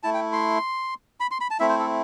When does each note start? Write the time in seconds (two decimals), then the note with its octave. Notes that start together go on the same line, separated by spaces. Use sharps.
0.03 A3 E4 A5
0.14 G5
0.33 C6
1.20 B5
1.31 C6
1.41 B5
1.51 A5
1.60 A3 C4 E4 E5
1.69 C5
1.79 A4